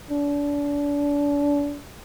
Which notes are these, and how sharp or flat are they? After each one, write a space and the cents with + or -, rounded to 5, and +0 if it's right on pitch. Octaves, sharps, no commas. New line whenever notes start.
D4 -30